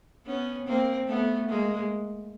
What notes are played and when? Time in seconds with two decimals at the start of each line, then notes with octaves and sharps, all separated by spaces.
0.26 B3 C#4
0.67 A#3 C4
1.08 A3 B3
1.49 G#3 A#3